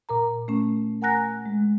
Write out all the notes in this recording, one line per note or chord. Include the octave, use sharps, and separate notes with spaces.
A#2 A#4 A#5
A3 C#4
A#4 F#5 G#5 A#5 F#6 A#6
G#3